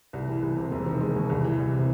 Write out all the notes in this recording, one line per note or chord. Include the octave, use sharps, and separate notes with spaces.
C2
E3
C2
C3
E1
D#3
G#3
D#2
C2
E3
C2
C3